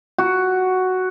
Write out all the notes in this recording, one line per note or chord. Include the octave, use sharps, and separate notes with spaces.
F#4